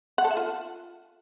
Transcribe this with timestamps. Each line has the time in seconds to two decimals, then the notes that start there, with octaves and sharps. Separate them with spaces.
0.18 F#5
0.24 A4
0.31 E5
0.37 F4